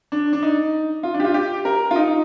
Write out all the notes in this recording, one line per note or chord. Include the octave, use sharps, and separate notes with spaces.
D4
D4
D#4
F4
D4
G4
F4
G4
A#4
F4
D#4